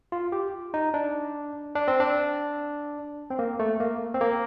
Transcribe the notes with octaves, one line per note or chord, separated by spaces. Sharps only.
F4
G4
D#4
D4
D4
C4
D4
C4
A#3
A3
A#3
C4
A#3